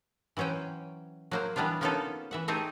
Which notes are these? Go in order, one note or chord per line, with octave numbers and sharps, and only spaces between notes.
E3 F#3 C#4 C5 G5
F#3 A#3 C5
E3 G3 B3 D4 F4
A#3 B3 C#4 D#4 F4 A4
E3 E5 F#5
A3 C4 D#4 G4 G#4